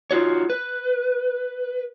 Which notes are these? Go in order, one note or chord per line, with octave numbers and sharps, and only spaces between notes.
D#4 F4 F#4 C#5
B4